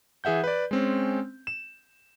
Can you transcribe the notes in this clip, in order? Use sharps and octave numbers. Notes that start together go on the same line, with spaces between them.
E3 G#4 E5 F#5 G6
B4 D5
G#3 C4 C#4
E7